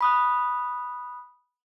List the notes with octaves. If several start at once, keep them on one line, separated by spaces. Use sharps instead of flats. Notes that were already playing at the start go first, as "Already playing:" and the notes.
B5 D#6 F#6